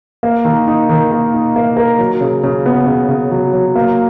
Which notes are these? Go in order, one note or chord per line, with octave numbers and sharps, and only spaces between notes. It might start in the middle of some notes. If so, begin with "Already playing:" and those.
A#3
D#3
D#4
D#3
A#3
D#4
A#3
A#4
F#3
C#3
C#3
B3
C#3
C#3
F#3
F#3
A#3